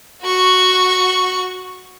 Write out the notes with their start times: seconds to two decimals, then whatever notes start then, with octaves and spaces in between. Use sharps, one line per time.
0.23 F#4 C#6